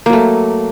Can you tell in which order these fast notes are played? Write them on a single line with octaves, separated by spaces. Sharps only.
A#3 F#3 A3